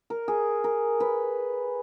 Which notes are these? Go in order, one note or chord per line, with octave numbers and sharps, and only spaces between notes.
A#4
G#4
A#4
B4